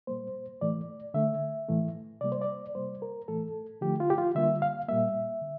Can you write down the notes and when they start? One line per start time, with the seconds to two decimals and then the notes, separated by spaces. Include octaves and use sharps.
0.07 A#2 G3 A#3 C5
0.61 A2 E3 A3 D5
1.14 D3 A3 E5
1.68 A2 E3 A3
2.21 C3 G3 A#3 D5
2.32 C5
2.42 D5
2.75 C3 G3 A#3 C5
3.02 A#4
3.28 A2 E3 A3 A4
3.81 D3 F3 A3 G4
4.00 F4
4.10 G4
4.18 F4
4.35 D3 G3 A#3 E5
4.62 F5
4.88 A#2 G3 A#3 E5
5.42 D3